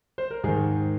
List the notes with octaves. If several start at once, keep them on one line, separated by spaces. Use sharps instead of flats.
C5
A#4
G#2 D#3 G#4